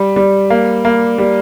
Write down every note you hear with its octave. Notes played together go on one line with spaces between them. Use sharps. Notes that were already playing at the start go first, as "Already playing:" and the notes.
Already playing: G3
G3
A#3
A#3
G3